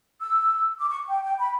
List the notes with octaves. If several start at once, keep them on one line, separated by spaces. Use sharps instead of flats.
E6
D6
C#6
G5
G5
B5